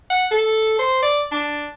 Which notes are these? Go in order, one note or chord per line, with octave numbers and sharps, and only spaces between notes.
F#5
A4
C5
D5
D4